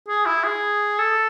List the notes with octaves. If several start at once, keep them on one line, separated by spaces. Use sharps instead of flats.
G#4
E4
G#4
A4